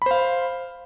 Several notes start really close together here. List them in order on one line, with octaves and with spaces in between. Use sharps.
B5 C5 F5